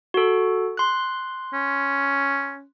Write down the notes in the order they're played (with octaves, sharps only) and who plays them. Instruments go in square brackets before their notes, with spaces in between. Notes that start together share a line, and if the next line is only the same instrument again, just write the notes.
[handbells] F#4 A4
C6 F#6
[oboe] C#4